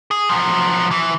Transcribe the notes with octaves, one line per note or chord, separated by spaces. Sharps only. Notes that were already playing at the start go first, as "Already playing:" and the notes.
G#4
F3 F#3
E3